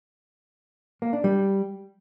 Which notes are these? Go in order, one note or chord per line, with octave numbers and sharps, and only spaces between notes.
A#3
D4
G3